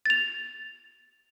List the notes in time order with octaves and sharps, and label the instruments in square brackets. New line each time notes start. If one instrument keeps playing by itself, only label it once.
[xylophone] A6 F7